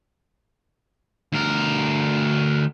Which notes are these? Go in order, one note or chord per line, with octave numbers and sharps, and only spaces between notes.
D2 A#4